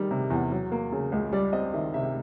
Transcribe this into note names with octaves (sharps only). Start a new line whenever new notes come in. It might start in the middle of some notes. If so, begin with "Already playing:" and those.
Already playing: D#3 G3
C3
E2
F#3
A#3
C#3
C#2
G3 D5
C4 D#5
D#3 E5
C3 E5